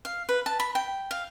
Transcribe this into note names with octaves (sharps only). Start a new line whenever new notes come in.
F5
B4
A5
B5
G5
F5